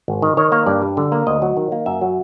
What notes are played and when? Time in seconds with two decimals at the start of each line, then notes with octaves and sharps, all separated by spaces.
0.08 G#1
0.22 D#3
0.37 D#3 C#5
0.52 A#3 C#5
0.66 G2 D5
0.82 G3
0.97 D3
1.12 A#3
1.27 D2 D#5
1.42 F#3
1.57 D#3
1.72 A#3
1.86 F#2 E5
2.01 F#3